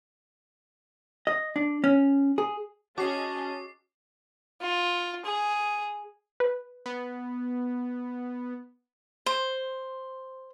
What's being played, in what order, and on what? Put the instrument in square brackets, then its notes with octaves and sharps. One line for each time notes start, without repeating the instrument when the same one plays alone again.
[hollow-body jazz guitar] D#5
D4
C#4
G#4
[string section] C#4 G#4 D#5 [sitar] F#4 [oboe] A5 [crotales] D6 C7
[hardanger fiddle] F4
G#4
[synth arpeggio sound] B4
[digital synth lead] B3
[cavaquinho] C5